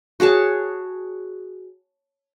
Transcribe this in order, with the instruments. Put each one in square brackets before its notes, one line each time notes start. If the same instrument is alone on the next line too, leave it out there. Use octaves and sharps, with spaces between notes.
[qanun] F#4 G#4 C#5 A5